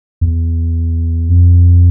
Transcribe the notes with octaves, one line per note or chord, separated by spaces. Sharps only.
E2
F2